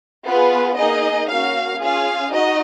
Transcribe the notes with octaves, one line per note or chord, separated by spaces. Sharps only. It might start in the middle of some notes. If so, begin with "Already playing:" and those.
B3 F4 G#4 B4
A#3 D#4 G#4 D#5
A#3 C#4 F#4 F5
C#4 F4 G#4 F5
D#4 F#4 D#5